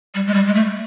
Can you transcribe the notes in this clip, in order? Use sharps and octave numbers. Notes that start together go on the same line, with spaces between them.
G3
G#3
G3
G#3
A3